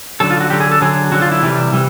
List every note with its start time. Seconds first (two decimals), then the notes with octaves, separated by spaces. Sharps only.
0.20 D3 F#3 A4
0.31 F4
0.40 F#4
0.50 D3 F#3 G4
0.60 G#4
0.71 A4
0.81 D3 F#3 G#4
1.12 D3 F#3 F#4
1.22 F4
1.32 E4
1.42 C3 E3 G3
1.72 C3 E3 G3